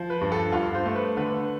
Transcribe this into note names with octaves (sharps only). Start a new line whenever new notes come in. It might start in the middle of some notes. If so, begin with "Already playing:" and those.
Already playing: F3
B4
G2
A4
G2 F4
C5
A3
B4
D3 B4